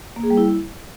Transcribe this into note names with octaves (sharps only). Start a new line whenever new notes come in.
A#3
G#4
G3
E4